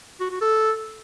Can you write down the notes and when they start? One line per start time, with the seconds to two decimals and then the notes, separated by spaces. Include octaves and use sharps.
0.20 F#4
0.31 F#4
0.41 A4